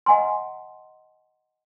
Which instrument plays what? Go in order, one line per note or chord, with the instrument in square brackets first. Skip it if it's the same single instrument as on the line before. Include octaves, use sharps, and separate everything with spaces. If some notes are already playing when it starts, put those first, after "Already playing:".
[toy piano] D#5 F#5 G#5 A#5 C6